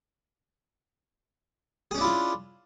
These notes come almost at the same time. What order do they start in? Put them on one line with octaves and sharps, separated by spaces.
G#4 C#4 D4 E4 F4